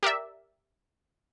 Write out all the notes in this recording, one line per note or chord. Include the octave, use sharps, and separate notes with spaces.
G4 A#4 D5 E5